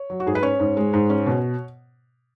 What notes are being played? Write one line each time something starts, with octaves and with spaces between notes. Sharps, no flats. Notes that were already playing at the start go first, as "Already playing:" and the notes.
Already playing: C#5
F#3
F#4
G#2 G#4
B4
C#4 C#5
G#2
G#3
G#2
C#4
B2